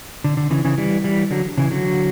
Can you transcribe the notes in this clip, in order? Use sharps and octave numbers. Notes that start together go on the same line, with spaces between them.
D3
D3
C#3 E3
C#3 E3
E3 G3
E3 G3
D3 F#3
C#3 E3
D3 F#3